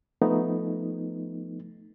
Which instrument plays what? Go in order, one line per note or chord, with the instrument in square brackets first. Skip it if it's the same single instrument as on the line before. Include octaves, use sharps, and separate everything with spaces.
[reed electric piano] F3 A3 B3 D#4